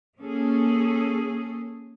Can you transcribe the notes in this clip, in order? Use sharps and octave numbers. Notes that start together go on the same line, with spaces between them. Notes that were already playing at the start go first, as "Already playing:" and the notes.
A#3 C#4 G#4 A4